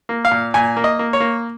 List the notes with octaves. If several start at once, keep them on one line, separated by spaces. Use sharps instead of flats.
A#3
F5
A#2
A#2 G#5
A#3
D#5
A#3
C#5
A#3